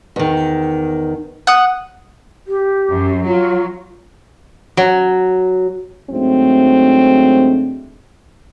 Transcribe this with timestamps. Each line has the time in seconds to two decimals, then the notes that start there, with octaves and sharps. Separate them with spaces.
0.16 E2 D#3
1.47 F#5 D#6
2.47 G4
2.90 F#2
3.25 F#3 F4
4.77 F#3
6.10 G#2 F#3 A3 C4 D4